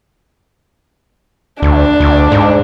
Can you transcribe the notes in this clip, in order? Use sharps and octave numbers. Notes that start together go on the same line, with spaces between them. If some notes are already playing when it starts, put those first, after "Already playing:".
D2 D4
D2
G#2